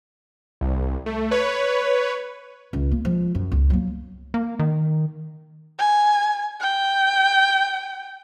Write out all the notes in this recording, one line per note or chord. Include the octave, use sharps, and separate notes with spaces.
C2
A3
B4 C#5
C#2
A#3
F3 G#3
F#2
C#2
F#3 A#3
A#3
D#3
G#5
G5